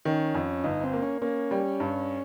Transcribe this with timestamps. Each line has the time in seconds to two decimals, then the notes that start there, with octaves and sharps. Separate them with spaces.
0.05 D#3 C#4
0.34 F2
0.64 G1 D#4
0.83 C4
0.94 A#3
1.02 C#4
1.22 A#3 C#4
1.51 G3
1.80 G2